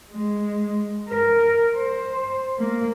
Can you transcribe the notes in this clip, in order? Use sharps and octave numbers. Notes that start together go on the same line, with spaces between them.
G#3
A#4
C5
A#3